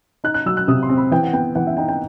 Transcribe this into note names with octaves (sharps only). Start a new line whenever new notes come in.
D#4 F#6
F#6
F#3 E6
F#6
C3 D#6
C6
C4
B5
E3 G5
F#5
B3 G5
E3 F#5
E5
D#4 G5
G5